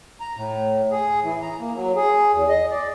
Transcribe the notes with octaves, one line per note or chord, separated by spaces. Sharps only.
A#5
A2
G#4
E3
A#5
A#3
F#3
G#4
E2
D#5
D5